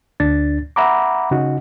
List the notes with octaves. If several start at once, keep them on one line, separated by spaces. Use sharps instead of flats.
D2 D4 A6
E5 F#5 A#5 B5 D6
C#3 D#4 F#4